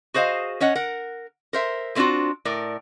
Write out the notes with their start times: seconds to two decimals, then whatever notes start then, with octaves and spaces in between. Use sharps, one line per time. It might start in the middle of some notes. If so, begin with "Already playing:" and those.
0.14 F#4 G#4 C5 D#5 F5
0.60 C#4 C#5 D#5 F#5
0.75 A#4 F#5
1.53 A#4 C5 E5
1.95 G#3 A3 C4 D4 F4 F#4
2.45 A2 A#4 D5